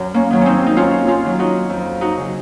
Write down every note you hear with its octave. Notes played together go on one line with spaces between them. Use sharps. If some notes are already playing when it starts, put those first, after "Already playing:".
Already playing: F#2
A#3 C#4
D#3 F#3
C4 C#4 D#4
D#4
F#2 C#4 F4
C#4 F4
D#3 F#3
D#4 F#4
F2
D#4 F#4
C#3 F#3